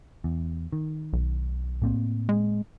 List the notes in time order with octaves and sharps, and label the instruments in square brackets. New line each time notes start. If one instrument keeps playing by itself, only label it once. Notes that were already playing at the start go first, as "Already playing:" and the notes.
[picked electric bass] E2
D#3
[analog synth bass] B1
[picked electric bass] A2 A#3 C4
[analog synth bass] G#3